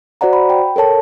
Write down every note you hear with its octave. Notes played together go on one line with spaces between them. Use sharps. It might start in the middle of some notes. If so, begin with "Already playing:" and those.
F#4 C5 D5 F#5 A#5
B5
G5
A4 A#4 C#5 A5